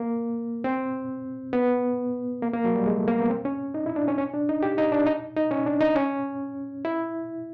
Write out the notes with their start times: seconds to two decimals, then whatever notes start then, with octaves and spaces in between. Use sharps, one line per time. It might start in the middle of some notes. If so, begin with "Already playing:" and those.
Already playing: A#3
0.64 C4
1.53 B3
2.42 A#3
2.53 A#3
2.64 F#3
2.75 G3
2.86 G#3
2.97 A3
3.08 A#3
3.19 B3
3.30 C4
3.45 C#4
3.74 D#4
3.86 E4
3.96 D4
4.08 C#4
4.18 C#4
4.34 D4
4.49 D#4
4.63 G4
4.78 D#4
4.92 D4
5.07 D#4
5.37 D#4
5.51 C#4
5.66 D4
5.81 D#4
5.96 C#4
6.85 E4